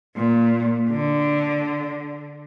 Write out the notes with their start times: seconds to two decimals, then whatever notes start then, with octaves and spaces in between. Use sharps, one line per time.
0.16 A#2
0.90 D3